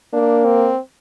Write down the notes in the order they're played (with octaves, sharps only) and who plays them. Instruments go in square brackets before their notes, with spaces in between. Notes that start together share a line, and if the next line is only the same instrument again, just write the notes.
[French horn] A#3 [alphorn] D4
[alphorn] C4